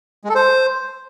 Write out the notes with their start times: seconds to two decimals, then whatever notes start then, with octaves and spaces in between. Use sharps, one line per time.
0.24 G#3
0.30 A4
0.35 C5